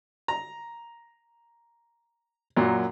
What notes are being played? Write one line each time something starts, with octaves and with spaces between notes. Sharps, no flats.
A#5
F#2 A#2 F#3